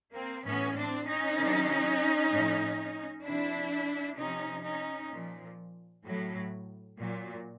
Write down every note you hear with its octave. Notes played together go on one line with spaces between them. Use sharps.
A#3 C4
A2 E3 B3 C#4
C4 D4
C#4 D#4
C3 D#3 F#3
A2 F3
C3 F3 D4 E4
C3 F3 C#4 D#4
C#4 D#4
A#2 F3
A2 F#3
A#2 F#3